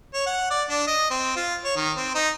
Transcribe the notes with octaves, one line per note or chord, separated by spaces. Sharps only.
C#5
F#5
D5
D4
D#5
C4
F4
C#5
D#3
C4
D#4